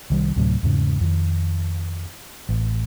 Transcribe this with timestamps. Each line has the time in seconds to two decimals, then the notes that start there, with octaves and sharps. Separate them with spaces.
0.10 C2 D#3 G3
0.36 D2 A2 C3 F#3
0.63 E2 G#2 C#3
1.01 F2 D#3
2.49 A1